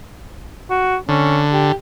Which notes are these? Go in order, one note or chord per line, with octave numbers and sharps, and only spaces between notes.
F#4
D3 C#4
G4